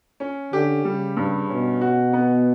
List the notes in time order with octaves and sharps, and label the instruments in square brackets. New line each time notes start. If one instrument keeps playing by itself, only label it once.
[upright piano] C#4
[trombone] D3 [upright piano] G4
[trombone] C#3 [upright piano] G3
[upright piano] G2
[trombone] B2 [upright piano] C#4
[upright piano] F#4
B3